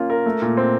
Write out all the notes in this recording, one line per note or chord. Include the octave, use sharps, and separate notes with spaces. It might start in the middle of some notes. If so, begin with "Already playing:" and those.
Already playing: A#3 C#4 F4
A#4
A3
A#2
C4